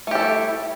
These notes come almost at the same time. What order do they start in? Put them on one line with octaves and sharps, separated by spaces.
A3 G4 A4 E4